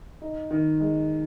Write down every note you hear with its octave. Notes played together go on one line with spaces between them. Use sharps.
D#4
D#3
G#3